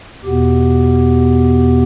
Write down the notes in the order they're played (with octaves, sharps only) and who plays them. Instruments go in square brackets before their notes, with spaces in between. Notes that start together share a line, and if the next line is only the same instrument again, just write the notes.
[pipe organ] E2 B2 B3 G4